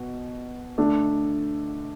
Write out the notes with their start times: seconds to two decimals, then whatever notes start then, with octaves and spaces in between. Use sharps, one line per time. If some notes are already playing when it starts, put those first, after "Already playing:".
Already playing: B2
0.78 D3 A3 D4